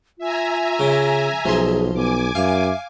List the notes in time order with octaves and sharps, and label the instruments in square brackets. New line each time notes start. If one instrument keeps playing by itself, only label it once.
[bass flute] F4 [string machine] E5 G#5 A#5
[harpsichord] C#3
[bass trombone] B1 [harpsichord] F3 C6 [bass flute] G#4
[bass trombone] B1 [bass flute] B3 [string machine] G#5 D6
[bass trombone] F#2 [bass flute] E5 [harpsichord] F5